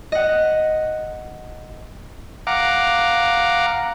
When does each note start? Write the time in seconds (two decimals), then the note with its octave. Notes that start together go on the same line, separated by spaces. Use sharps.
0.12 D#5 F#5
2.47 F5 F#5 A#5 D6